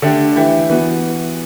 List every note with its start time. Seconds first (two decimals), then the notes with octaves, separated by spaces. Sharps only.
0.02 D3 A3 D4 G4
0.36 E3 A3 E4 G4
0.70 E3 B3 F#4